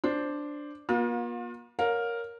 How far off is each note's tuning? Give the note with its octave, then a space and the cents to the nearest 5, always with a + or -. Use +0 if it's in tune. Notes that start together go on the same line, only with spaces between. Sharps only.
D4 +0 C5 +0
A#3 +45 F4 +35
A#4 +0 C#5 +10 F5 +35